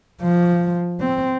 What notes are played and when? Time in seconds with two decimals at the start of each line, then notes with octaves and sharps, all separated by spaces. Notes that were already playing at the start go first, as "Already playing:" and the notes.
0.22 F3
1.01 C4